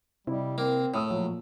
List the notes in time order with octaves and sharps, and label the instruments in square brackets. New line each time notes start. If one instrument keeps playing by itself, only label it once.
[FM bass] C3 [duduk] G3 [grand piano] E4 D#5
[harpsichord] A#3 [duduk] C4
[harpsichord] A2 [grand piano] C#5 D#6 E6
[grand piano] A#2 [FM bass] F3 [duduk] F#3